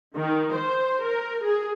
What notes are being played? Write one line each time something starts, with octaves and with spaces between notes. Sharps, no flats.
D#3
C5
A#4
G#4